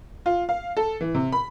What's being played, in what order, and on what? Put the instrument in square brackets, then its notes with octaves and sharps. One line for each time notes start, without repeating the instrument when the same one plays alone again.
[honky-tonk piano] F4
F5
A4
E3
C3
B5